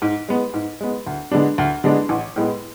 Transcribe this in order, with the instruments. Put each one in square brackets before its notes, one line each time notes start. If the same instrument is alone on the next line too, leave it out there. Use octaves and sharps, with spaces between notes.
[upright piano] G#2
G#3 B3
G#2
G#3 B3
D2
D3 G#3 B3 D4
D2
D3 G#3 B3 D4
A1
A2 G#3 B3